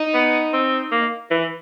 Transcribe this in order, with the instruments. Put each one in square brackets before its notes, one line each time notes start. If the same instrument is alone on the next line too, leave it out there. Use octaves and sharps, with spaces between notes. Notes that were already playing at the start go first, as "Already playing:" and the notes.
Already playing: [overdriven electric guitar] D#4
[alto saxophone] B3
C4
A#3
E3